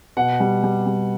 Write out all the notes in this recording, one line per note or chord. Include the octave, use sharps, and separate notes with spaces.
B2 F#5
G3
G3
G3